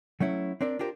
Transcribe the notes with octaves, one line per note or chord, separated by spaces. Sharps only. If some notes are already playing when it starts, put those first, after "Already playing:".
F#3 A3 C#4 E4
C4 D4 A#4 D5
D4 F4 G4 A#4 C5